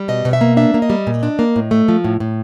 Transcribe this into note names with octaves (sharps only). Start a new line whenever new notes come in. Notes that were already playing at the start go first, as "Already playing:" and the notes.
Already playing: G3
B2 D#5
B2
E5
A#3
D4 E5
A#3
D#5
G3
A#2
D4
A#3
A2
A3
F3
A2
A2